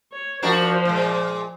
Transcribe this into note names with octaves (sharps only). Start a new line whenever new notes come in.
C#5
F3 D4 F#4 A#4 C5
A#2 G#3